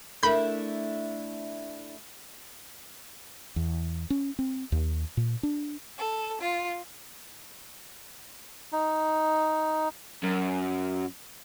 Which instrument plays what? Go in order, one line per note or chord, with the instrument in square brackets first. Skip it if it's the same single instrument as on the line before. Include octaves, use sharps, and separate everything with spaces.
[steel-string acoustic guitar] A3 D4 E4 [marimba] A4 A#4 E5 [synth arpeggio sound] B5 G6
[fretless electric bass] E2
C#4
C4
D#2
A#2
D4
[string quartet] A4
F4
[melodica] D#4
[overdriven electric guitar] F#2